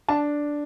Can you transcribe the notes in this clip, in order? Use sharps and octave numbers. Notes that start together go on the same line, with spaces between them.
D4 A5